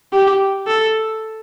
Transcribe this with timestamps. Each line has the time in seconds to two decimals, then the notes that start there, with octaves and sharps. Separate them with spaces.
0.13 G4
0.67 A4